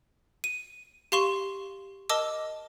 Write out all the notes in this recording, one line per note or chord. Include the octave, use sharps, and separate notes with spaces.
D#7
G4 F5 C6 C#6 E7
A#4 D#5 A5 D6 E6